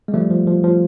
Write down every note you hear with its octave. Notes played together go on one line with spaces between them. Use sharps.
G#3
F3 G3 A3
F3
F3
F3